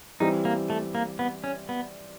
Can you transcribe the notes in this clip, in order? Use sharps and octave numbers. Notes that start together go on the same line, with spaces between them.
E3 G3 C4 D#4
A#3
A3
A#3
B3
C#4
B3